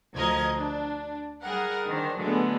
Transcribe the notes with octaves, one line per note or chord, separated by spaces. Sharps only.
D2 F3 A#4 D#5 G#6
D4
G3 G#4 A#4 F#5
D#3 D4 C5
D3 F#3 G#3 A3 B3